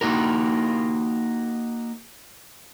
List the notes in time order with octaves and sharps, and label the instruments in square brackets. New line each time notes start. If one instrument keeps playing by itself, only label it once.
[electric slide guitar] A#3 D#4 F#4 A#4